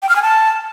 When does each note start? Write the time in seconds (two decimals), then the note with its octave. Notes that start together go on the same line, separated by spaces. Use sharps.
0.02 G5
0.09 F6
0.16 G#5
0.22 A5